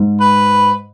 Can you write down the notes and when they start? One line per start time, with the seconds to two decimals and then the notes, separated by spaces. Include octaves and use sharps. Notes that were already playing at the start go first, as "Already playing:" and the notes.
Already playing: G#2
0.20 B4